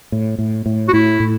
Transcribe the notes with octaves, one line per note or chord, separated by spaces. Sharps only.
A2
A2
A2
F#4
A2 E4
A2